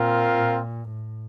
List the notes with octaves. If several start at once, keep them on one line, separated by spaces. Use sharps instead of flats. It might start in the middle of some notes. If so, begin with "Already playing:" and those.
Already playing: A#2 C4 F4 A#4
A#2
A2